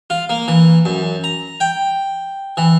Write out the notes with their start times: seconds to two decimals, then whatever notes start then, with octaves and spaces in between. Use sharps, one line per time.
0.10 F4
0.29 A#3
0.48 E3
0.85 F#2
1.24 A#5
1.60 G5
2.57 E3